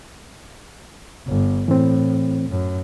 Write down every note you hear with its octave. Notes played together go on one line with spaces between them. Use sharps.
G1
A2 E3 C4
F#2